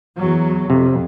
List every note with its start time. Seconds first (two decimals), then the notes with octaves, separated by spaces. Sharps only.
0.17 E2 F#3
0.70 F2 C3